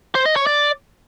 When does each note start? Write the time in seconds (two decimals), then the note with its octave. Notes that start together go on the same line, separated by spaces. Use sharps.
0.15 C5
0.26 D#5
0.36 C#5
0.47 D5